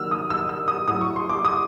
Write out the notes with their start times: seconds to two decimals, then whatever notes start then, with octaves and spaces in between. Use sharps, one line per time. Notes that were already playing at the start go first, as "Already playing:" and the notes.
Already playing: D#3 F#3 A#3 E6 F6
0.11 D#6
0.30 E6
0.49 E6
0.68 D#6
0.88 A2 F#3 A3 D#6
1.01 C#6
1.16 C6
1.29 D6
1.45 D#6